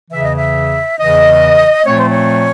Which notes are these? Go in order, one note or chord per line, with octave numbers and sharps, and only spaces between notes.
E2 C#3 E3 E5
D#5
E5
E2 C#3 E3 D#5
A#2 F3 A3 C4 C#5
C5
C#5